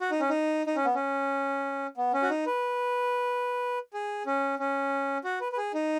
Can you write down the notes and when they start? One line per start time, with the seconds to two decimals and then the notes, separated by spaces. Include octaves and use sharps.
0.01 F#4
0.11 D#4
0.20 C#4
0.29 D#4
0.67 D#4
0.76 C#4
0.85 B3
0.95 C#4
1.97 B3
2.14 C#4
2.22 F#4
2.30 D#4
2.46 B4
3.94 G#4
4.26 C#4
4.59 C#4
5.24 F#4
5.41 B4
5.52 B4
5.57 G#4
5.74 D#4